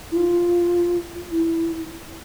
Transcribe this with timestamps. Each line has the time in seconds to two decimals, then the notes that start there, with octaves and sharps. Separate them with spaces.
0.12 E4
0.16 F4
1.31 E4